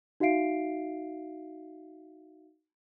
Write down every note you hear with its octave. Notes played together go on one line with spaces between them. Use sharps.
D#4 F#4 E5 F5 C7 D7